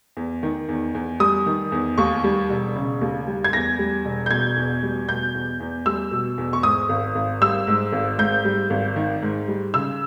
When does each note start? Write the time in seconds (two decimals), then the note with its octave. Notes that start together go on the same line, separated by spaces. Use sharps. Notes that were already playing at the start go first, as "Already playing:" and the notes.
0.17 E2
0.43 D#3
0.69 E2
0.95 E2
1.20 G3 D#6
1.46 D#3
1.72 E2
1.98 D#2 C#6
2.24 G3
2.49 E1
2.76 C#3
3.01 D#2
3.27 G3
3.44 G#6
3.53 E2 A#6
3.79 G3
4.05 E1
4.26 G6
4.31 B2 G#6
4.56 E2
4.82 G3
5.08 B2 G6
5.35 E2
5.60 E2
5.86 G3 E6
6.11 B2
6.38 E2
6.53 C#6
6.63 G#2 D#6
6.89 G#1
7.15 G#1
7.41 G3 E6
7.67 G#2
7.92 G#1
8.18 G#2 G6
8.44 G3
8.70 G#1
8.96 D#3
9.22 G#2
9.48 G3
9.74 C#3 E6